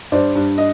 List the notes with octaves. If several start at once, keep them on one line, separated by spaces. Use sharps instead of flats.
G2 C5 D5
G2
D#5